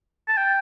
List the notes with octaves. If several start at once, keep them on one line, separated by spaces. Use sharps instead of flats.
A5
G5